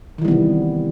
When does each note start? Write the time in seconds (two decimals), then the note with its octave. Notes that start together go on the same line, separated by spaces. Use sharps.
0.18 D#3
0.22 E3
0.25 G3
0.28 B3
0.31 C3